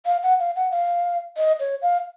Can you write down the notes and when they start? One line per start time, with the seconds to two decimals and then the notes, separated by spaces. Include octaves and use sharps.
0.06 F5
0.23 F#5
0.40 F5
0.56 F#5
0.71 F5
1.37 D#5
1.60 C#5
1.82 F5